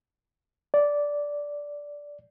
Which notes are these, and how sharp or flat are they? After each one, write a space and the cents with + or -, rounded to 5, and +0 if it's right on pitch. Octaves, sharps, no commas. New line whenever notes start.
D5 -10